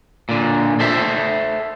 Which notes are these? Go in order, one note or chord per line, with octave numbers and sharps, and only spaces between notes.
A#2 D3
A4 C5 E5